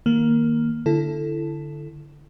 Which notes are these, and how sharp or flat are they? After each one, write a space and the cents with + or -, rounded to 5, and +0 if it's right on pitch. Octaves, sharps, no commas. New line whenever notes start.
D#3 +15 A#3 +0
D3 +0 E4 +15 A4 +0